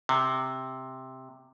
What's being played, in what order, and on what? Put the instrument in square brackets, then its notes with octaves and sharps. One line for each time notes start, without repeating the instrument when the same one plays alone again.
[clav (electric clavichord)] C3